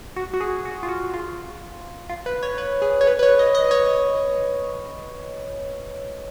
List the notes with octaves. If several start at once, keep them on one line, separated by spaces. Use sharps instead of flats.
F#4
F#4
G#4
F#4
F4
F#4
F4
F4
B4
C#5
B4
G#4
C#5
B4
B4
C#5
D#5
D#5
C#5